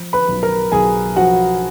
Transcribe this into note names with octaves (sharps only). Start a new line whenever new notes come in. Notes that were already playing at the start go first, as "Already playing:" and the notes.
Already playing: F3
B4 B5
B1
A#4 A#5
B1 G#4 G#5
F3 F#4 F#5